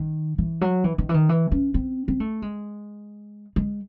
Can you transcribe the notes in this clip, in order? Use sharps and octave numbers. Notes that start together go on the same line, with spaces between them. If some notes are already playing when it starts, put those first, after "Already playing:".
Already playing: D#3
E3
F#3
E3
D#3
E3
D#3
E3
C#4
C4
C4
A3
G#3
G#3